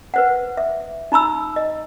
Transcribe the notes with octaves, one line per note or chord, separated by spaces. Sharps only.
B4 C5 F#5
E5
D#4 A#5 B5 E6
D#5